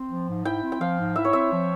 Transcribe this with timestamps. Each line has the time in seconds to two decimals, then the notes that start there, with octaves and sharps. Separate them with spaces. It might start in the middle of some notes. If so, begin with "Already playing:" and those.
Already playing: C4
0.10 F3
0.28 G#2
0.45 E4 G5
0.63 C4
0.72 G5
0.80 F3 F5
0.98 G#2
1.16 E4 E5
1.25 C#5
1.33 C4 E5
1.52 F3